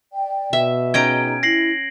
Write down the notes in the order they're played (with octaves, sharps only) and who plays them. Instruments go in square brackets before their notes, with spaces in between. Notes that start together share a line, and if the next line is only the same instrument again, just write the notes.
[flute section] D5 G5
[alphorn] B2 [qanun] E5
[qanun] C#4 D#5 G5 [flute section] D#4 G#4 A#5 [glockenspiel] G#6 D7
[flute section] E4 [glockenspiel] A#6 C7 F#7